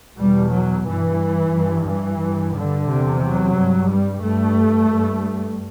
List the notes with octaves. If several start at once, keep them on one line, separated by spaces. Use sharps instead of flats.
E2 B2 G3
F#3
G2 E3
G2
E3
G2
D3
E2 C3
F#3
G2
G3
G2 A3
G2